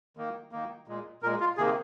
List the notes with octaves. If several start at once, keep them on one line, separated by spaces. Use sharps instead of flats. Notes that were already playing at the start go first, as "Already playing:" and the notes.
D#3 A#3
D#3 A#3
A#2 G#3
A#2 G#3 A#4
F4
C3 D#3 A#3 G#4